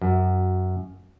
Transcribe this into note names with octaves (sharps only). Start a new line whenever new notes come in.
F#2